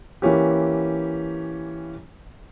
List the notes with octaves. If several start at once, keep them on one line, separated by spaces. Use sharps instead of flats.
E3 A#3 C#4 G4